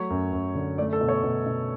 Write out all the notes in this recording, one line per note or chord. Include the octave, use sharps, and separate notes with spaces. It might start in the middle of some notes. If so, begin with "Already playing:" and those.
Already playing: F#3 A3 C#5
F#2
F#2
D3
A3 D5
A4
B2
C#5
B2
B2